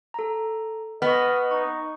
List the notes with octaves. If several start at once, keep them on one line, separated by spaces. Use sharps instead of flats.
A4 A#5
B3 D#5 C#6 F6
D#4 C#6